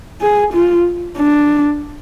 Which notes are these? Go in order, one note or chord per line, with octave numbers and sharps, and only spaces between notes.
G#4
F4
D4